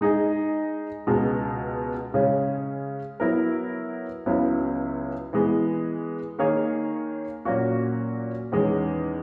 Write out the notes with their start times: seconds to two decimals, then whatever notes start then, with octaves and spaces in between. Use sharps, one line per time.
0.01 G#3 D#4 G#4 D#5
1.07 C#2 B2 G#3
2.14 C#3 G#3 C#4
3.20 F#3 B3 E4 A#4
4.26 C#2 C#3 F#3 B3 E4
5.33 E3 G#3 B3
6.39 D#3 A#3 D#4 G#4 C#5
7.45 A#2 F#3 A#3 C#4 F#4
8.52 E2 D#3 G#3 C#4